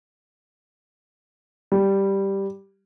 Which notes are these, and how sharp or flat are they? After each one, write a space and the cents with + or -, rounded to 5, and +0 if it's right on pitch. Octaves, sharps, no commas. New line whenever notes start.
G3 +0